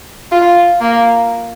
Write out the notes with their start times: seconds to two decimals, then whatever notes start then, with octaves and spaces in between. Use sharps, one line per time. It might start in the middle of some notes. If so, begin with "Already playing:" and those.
0.31 F4
0.81 A#3